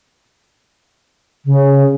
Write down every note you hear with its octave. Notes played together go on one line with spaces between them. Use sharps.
C#3